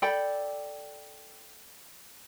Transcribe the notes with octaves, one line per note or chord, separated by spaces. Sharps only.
A4 D5 G5 B5